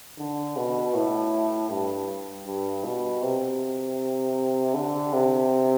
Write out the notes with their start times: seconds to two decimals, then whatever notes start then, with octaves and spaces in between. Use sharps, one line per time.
0.18 D3
0.57 B2
0.94 A2
1.70 G2
2.47 G2
2.84 B2
3.22 C3
4.74 D3
5.13 C3